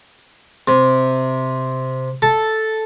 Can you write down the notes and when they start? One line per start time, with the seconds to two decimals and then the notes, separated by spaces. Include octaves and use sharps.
0.68 C3
2.22 A4